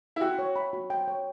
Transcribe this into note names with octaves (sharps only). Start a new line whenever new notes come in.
E4
F#4 G5
C#5
B5
F#4
G5
C#5